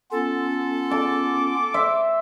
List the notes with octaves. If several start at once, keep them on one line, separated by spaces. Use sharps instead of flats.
B3 C#4 F4 A4
A5 D6
C5 E5